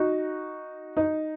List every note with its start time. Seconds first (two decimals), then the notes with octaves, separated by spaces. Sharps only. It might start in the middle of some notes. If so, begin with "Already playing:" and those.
Already playing: D#4 F#4
0.97 D#4